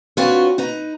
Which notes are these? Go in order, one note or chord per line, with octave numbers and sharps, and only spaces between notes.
C4 D4 F4 F#4 B4 C#5
D#4 B4 A#5